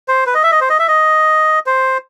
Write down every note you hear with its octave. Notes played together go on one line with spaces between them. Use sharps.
C5
B4
D#5
E5
D#5
C5
D#5
E5
D#5
C5